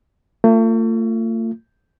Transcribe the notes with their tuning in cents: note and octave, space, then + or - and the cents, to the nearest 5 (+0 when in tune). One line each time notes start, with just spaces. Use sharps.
A3 +45 F4 +0